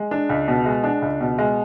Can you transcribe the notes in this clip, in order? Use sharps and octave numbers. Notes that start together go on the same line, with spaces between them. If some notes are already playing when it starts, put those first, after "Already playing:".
Already playing: G#3
D4
C#2
B2
G#3
D4
C#2
B2
G#3